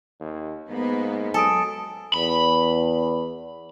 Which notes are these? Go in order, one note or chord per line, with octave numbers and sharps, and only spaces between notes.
D#2
G#2 A#3 B3
F#3 A4 G#5 D#6 D7
E2 B5